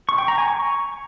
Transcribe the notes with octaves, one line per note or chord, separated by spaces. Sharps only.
C#6
G5
A#5
G#5
C#6